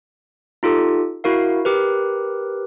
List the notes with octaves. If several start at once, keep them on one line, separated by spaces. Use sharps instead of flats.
D#4 F4 G4 A4
E4 F#4 A#4 F5
G4 A#4 B4